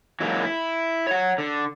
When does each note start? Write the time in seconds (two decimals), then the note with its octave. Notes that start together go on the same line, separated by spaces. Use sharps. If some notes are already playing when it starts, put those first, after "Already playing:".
0.20 E3 F#3 G#3 A#3
0.44 E4
1.07 C#5 F#5
1.38 D3